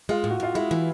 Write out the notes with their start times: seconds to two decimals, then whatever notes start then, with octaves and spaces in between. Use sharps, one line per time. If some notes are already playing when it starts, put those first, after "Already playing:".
0.09 G#3 F4
0.24 A2
0.30 F#4
0.40 A2 F4
0.55 G#3 E4
0.71 E3